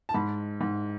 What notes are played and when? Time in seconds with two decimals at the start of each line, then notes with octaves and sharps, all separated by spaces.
0.09 A5
0.14 G#2 B5
0.61 G#2